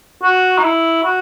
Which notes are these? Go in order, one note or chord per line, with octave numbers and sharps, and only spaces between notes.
F#4
D#4
E4
F#4